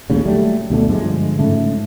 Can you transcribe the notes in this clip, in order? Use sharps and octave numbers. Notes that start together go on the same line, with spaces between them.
A#1 D#2 A2 C#3
F#3 G3 A3
D2 B2 D3 A3
G2 D3 F3 G#3
G#2 C#3 A3